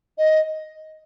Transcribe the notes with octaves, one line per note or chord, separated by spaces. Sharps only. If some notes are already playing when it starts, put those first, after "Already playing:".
D#5